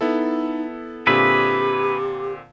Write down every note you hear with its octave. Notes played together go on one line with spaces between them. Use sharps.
B3 D#4 E4 A4
A#2 D3 C4 G4 G#4 B4 E5